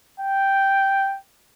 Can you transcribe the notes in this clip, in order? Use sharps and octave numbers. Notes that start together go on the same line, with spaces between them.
G5